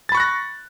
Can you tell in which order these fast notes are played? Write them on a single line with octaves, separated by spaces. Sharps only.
A6 B5 C#6 F#6 A#6